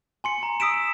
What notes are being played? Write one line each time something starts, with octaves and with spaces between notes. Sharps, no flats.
G#5 C6 C#7
A#5
D#6 E6 B6 D7 E7